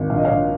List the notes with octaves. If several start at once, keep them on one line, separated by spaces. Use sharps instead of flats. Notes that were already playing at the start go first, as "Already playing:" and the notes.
Already playing: G#1
A#1 F5
D#5
A#1 C#5 F5